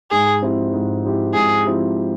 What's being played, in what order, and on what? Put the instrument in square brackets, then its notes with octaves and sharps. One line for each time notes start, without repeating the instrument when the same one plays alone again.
[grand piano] G#2 [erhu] G#4
[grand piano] F3 C4 E4 G4
G#2
F3 C4 E4 G4
[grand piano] G#2 [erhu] G#4
[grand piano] F3 C4 E4 G4